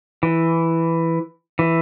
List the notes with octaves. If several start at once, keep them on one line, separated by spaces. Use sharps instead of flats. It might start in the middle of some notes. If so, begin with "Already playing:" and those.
E3
E3